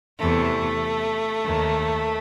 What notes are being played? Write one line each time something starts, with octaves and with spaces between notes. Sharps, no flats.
E2 C3 E3 A3
D#2 D#3